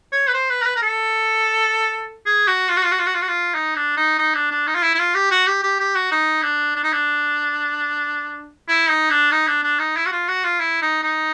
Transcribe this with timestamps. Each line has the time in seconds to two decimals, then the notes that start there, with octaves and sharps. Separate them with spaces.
0.13 C#5
0.28 B4
0.34 C5
0.50 B4
0.62 A#4
0.66 B4
0.76 A#4
0.82 A4
2.26 G#4
2.48 F#4
2.69 F4
2.77 F#4
2.83 F4
2.91 F#4
2.99 F4
3.06 F#4
3.14 F4
3.22 F#4
3.28 F4
3.55 D#4
3.76 D4
3.97 D#4
4.19 D#4
4.35 D4
4.51 D4
4.68 D#4
4.75 F4
4.82 E4
4.95 E4
4.99 F4
5.15 G4
5.31 F#4
5.47 G4
5.63 G4
5.80 G4
5.95 F#4
6.12 D#4
6.43 D4
6.76 D4
6.84 D#4
6.93 D4
8.68 E4
8.90 D#4
9.11 D4
9.32 D#4
9.48 D4
9.64 D4
9.80 D#4
9.97 E4
10.06 F#4
10.12 F4
10.28 F#4
10.44 F4
10.60 E4
10.82 D#4
11.03 D#4